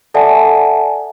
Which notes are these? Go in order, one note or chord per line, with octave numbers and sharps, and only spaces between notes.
A4 D5 E5 F#5 G#5 A5